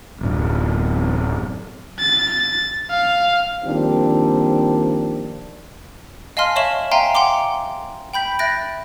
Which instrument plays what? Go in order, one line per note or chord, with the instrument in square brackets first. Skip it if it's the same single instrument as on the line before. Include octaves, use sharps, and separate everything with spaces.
[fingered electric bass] D1 F#2
[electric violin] A6
F5
[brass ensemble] D#3 F3 G3 A#3 C4 D4
[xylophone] D#5 F5 G#5 A5 C6 F6
C#5 D#5 E5 C#6 E7 F#7
E5 F5 G5 G#5 A#5 C6
F#5 G5 A#5 C6 D6
G5 B5 G6 B6
E5 F#6 A6 A#6 D7